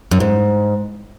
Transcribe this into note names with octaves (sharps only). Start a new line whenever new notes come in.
F#2
G#2